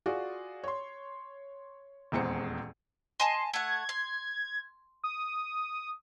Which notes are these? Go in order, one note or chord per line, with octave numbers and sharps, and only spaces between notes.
F4 F#4 G#4 D5
C#5 C6
D#1 E2 G#3 C4 A#5 C#7
D#5 G#5 A5 C6
A3 F#5 G#6
C6
D#6